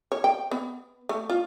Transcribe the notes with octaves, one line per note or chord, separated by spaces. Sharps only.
C#5
G5
B3
A3
F4